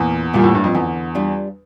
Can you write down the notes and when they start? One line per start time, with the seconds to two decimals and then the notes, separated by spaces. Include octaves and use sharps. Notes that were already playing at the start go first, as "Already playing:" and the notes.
Already playing: E2 A#2
0.33 A#2 G3 A#3 E4
0.44 A2
0.55 G2
0.64 F2
0.75 E2 D3
1.15 G3 D4 F4